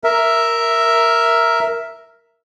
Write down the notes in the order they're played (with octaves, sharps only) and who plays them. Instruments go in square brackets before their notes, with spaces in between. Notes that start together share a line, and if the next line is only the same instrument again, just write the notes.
[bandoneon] A#4 E5